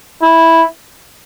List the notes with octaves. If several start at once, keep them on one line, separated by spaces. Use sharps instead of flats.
E4